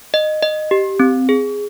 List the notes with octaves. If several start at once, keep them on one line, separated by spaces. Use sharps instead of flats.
D#5
D#5
G4
C4
G#4